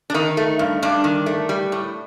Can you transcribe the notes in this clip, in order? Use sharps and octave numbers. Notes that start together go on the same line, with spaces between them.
D4
D#3 D#4
A3
G2
G2 D4
D#3
A3
G3
A2